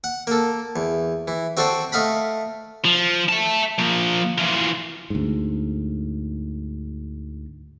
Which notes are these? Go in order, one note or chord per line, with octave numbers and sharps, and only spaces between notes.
F#5
A#3 A4
E2
E3
C4 F#4 A4 C5 D5 G5
A3 D#5 F5 F#5 B5
F3
E5 A5
F3 A#3
E3 F4
D2 G#2